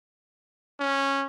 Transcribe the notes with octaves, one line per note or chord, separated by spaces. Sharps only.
C#4